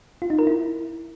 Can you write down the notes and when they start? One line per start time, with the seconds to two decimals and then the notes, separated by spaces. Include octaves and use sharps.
0.22 F4
0.30 D#4
0.39 A#4
0.47 E4